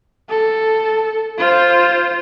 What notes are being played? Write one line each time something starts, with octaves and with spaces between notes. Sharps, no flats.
A4
F4 C5